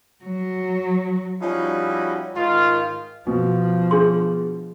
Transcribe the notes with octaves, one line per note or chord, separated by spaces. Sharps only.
F#3
F3 G3 C#4 D#4 E4 F#4
G#2 D#3 F4
B2 F3
D4 G#4 C6